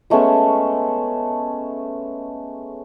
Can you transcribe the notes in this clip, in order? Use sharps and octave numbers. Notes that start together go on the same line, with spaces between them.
G#3 A3 B3 C#4